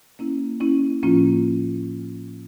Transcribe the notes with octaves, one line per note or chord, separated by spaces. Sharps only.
A#3 C#4 E4
A#3 C#4 E4
A2 F3 A#3 C#4 F4